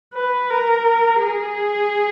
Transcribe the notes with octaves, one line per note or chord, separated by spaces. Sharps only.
B4
A#4
G#4